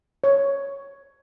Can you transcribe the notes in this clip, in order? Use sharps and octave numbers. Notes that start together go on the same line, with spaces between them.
C#5